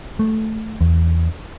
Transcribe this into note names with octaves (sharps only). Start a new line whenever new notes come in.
A3
E2